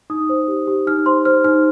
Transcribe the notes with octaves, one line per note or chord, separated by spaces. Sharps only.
D#4 D#6
C5
G4
G4
D#4 F6
C5 C6
C5 F6
D#4 F6